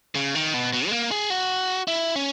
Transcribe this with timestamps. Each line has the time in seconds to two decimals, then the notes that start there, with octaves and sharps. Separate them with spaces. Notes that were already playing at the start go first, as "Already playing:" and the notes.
0.15 C#3
0.35 D#3
0.54 B2
0.73 B2
0.87 G#3
0.91 A#3
1.11 G#4
1.30 F#4
1.88 E4
2.16 C#4